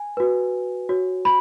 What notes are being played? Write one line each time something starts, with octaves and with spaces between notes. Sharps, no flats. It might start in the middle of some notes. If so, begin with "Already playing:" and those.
Already playing: G#5
F#4 B4
F#4 C#5
B5